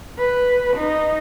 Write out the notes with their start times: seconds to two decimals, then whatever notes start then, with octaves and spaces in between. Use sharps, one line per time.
0.19 B4
0.77 D#4